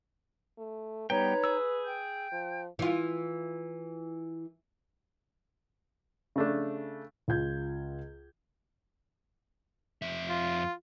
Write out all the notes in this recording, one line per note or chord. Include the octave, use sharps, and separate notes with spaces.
A3
G3 B3 D#4 B4 C#5 G5 A#5
G#4 E6
G5 G6
F3
E3 F4
C#3 A3 D4
C#2 F4 G6 G#6
F2 E5
F4